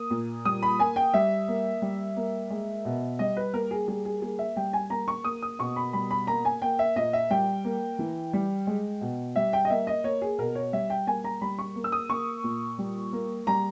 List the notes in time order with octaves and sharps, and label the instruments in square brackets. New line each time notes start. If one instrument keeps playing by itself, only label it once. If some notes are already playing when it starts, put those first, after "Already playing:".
Already playing: [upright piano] A#3 D#6
A#2
G3 D#6
B5
A#3 G#5
G5
G3 E5
A#3
G3
A#3
G#3
B2
G3 D#5
B4
A#3 A#4
G#4
G3 G#4
G#4
A#3 G#4
E5
G3 G5
G#5
A#3 A#5
C#6
A#3 D#6
D#6
B2 C#6
B5
G3 B5
B5
A#3 A#5
G#5
A#3 G5
E5
A#2 D#5
E5
G3 G5
A#3
E3
G3
G#3
B2
G3 E5
G5
D#5
A#3 E5
D#5
A#3 C#5
G#4
B2 A#4
C#5
G3 E5
G5
A#3 G#5
A#5
G3 B5
C#6
A#3
E6
D#6
A#3 C#6
A#2
G3
A#3
G3 A#5